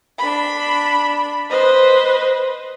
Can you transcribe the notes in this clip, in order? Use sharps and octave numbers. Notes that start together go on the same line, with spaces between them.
D4 B5
B4 C5 D#5